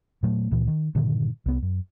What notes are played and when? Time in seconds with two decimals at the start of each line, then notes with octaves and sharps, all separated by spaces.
0.23 A#2 F#3 A3
0.51 C#2 A#2 E3
0.68 D#3
0.95 G2 A#2 D3 D#3
1.46 C2 B3
1.62 F#2